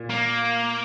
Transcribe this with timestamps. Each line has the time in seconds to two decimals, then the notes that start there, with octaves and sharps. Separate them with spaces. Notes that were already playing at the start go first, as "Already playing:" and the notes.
Already playing: A#2
0.10 A#3